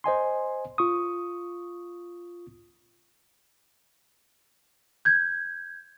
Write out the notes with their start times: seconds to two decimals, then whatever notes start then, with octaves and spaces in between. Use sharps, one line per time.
0.04 C5 D#5 G#5 C6
0.78 F4 C#6 D#6
5.05 G6 G#6